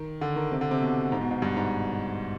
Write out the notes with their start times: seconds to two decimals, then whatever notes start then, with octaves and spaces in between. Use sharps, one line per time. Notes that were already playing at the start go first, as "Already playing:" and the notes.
Already playing: D#3
0.21 D3
0.36 D#3
0.52 C3
0.61 D3
0.71 C3
0.81 B2
1.12 G#2
1.21 B2
1.31 G#2
1.42 G2
1.57 G#2